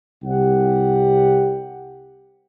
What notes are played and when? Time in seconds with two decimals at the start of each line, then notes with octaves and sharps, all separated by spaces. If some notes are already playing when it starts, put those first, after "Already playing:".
0.24 C2 G4 F#5